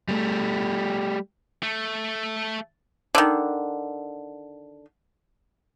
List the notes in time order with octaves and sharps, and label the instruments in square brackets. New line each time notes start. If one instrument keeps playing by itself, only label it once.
[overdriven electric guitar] G3 A3
[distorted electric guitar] A3
[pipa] D3 D#3